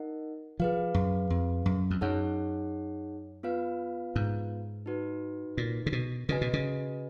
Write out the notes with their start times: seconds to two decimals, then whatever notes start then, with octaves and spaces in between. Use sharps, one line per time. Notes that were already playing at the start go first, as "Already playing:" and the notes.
Already playing: D#4 A#4 D#5 F#5
0.60 F3 G#4 B4 F5
0.94 F#2
1.30 F2
1.66 F#2
1.91 F2
2.01 F#2 D#4 G#4 C#5 F#5
3.43 B3 F4 B4 F5
4.16 G#2
4.86 D#4 F#4 B4
5.57 A#2
5.86 C#3
5.92 B2
6.28 C#3 F#4 B4 D#5 G#5
6.41 B2
6.53 C#3